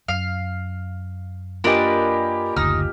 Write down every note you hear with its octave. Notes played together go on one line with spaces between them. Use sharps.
F#2 F5
A#3 D4 F4 G4 A#4 B4 D#5 G#5
F#1 D2 D#4 F6